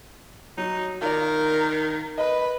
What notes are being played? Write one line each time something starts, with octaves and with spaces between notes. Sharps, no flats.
F#3 D#4
D#3 F4 A#4 D5
B4 D#5